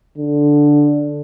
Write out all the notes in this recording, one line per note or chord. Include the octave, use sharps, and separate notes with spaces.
D3